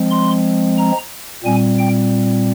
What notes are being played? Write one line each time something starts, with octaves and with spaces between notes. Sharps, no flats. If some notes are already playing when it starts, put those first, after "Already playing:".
Already playing: F3 G#3 C4
C6
A#5
A#2 G3 C4 G#5
G5